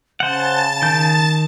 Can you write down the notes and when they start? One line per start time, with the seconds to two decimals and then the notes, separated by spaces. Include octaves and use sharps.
0.20 C#3 C5 F#5 A5 A6
0.82 D#3 G6